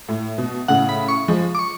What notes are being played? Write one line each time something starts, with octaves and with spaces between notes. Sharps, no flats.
A2
B2
A2 C#3 F#5
B5
C#6
F3 G#3
D6
C#6